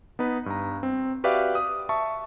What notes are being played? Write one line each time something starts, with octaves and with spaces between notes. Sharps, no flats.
B3 D#4 B4
G2 A#5
C4
F#4 G4 B4 D5 E5 F5
D#6
E5 A5 C#6